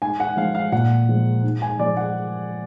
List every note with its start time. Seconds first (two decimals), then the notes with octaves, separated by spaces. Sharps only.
0.02 G#2 G#5
0.20 F#5
0.37 F3 G#3 F5
0.55 F5
0.72 A#2 F#5
1.09 F3 G#3
1.43 G#2
1.62 G#5
1.79 F3 G#3 D5
1.97 F#5